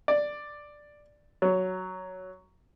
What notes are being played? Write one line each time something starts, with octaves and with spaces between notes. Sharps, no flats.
D5
F#3